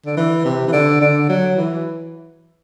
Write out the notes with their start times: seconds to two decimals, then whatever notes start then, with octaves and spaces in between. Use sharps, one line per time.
0.06 D3
0.17 E3
0.45 C3
0.67 E3
0.73 D3
1.01 D3
1.29 F#3
1.57 E3